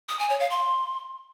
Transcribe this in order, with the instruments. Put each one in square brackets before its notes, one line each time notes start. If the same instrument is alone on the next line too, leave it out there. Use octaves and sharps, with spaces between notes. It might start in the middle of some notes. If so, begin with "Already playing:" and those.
[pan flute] D#6
G#5
C#5
F5
C6